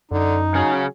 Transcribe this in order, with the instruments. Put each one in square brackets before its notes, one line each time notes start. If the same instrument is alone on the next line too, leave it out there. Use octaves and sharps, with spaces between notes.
[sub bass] F#2 [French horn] D3 [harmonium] D#4
[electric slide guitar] C#3 G#4 [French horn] F#3